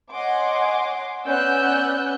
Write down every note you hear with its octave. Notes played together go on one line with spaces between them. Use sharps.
C#5 D#5 F#5 G#5 C6 D6
B3 C#4 D5 E6 F#6 G6